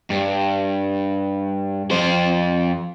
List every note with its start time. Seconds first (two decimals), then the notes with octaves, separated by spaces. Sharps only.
0.10 G2
1.91 F2 C5